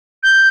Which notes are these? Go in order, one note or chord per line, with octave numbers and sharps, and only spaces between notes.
G6